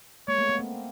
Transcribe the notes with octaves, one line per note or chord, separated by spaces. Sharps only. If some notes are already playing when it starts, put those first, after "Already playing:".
G#3 A#3 C#5
A3 B3
A3 B3
A#3 C4